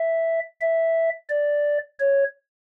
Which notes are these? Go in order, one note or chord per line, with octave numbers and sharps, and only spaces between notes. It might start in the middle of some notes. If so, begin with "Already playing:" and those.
Already playing: E5
E5
D5
C#5